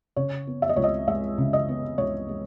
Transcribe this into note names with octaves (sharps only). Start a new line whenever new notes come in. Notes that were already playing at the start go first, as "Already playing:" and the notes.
C#3 C#5
B3
E5
D#5
C#2 C#5
D#5
G#3 E5
C#3
D#5
B3
C#2 C#5
G#3